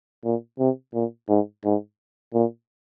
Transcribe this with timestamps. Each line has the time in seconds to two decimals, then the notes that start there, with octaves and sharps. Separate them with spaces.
0.24 A#2
0.59 C3
0.94 A#2
1.29 G#2
1.65 G#2
2.34 A#2